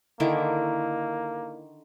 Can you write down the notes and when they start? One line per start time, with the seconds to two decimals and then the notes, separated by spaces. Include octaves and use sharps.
0.20 D3 D#3 A#3 E4